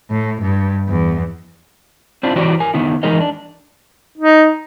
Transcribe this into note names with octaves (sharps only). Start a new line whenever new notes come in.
A2
G2
E2
C4 D4 E4 F4
E3 E4 F#4 G4 C#5 D5
A#4 G#5
D3 D#3 B3 E4
E3 G#3 D#4 G#4 A#4 D#5
D4
D#4